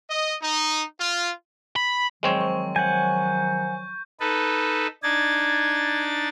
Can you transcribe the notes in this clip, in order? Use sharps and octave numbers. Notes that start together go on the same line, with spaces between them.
D#5
D#4
F4
B5
D#3 F3 F#3 G#3 C4 C#5
C#6
F#5 G#5 G6
D#4 A4 B4
D4 D#4 G#6 A6